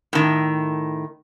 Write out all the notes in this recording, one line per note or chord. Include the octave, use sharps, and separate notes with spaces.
A2 D#3